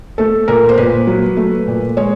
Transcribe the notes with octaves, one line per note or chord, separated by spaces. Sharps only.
A3 A4
A#2 A#4
C5
A#2 B4
F#3
A3
A#2
G#3 C#5